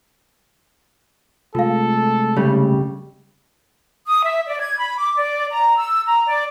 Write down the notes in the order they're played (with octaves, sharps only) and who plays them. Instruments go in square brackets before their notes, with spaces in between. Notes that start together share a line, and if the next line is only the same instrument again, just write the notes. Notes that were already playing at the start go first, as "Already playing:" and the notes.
[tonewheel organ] C3 G#3 A3 [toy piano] F4 F5 [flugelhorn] A4
[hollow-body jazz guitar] C#3 G3 [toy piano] C#5
[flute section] D#6
E5
D5
G#6
B5
D6
D5
A#5
E6
A#5
D5